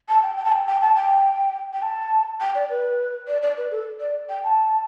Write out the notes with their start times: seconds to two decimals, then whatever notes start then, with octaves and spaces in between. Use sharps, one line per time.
0.09 A5
0.23 G5
0.37 G5
0.45 A5
0.52 G5
0.67 G5
0.81 A5
0.95 G5
1.73 G5
1.82 A5
2.41 G5
2.55 D5
2.70 B4
3.28 D5
3.42 D5
3.57 B4
3.71 A4
4.00 D5
4.29 G5
4.44 A5